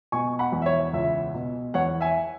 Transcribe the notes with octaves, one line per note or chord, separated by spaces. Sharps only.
B2 G#5 C#6
F#5 B5
E2
E5
C#5
C#2 E5
B2
E2 C#5 F#5
E5 G#5